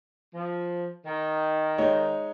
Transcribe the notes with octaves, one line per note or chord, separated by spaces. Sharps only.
F3
D#3
G#3 D#4 C#5